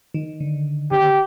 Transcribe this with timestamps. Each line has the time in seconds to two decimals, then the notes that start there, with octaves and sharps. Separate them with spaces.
0.14 D#3
0.40 D3
0.91 D3 G4